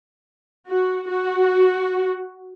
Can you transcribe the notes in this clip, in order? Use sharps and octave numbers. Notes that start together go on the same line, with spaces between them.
F#4
F#4